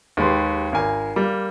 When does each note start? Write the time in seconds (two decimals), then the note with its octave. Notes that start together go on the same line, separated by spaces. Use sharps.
0.17 D#2 G#3 G4 B4 C6
0.72 G#1 A#4 G#5
1.16 G3 A#3